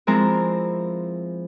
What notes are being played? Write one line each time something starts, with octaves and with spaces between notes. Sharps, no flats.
F3 G#3 C4 E4 A#4 A#5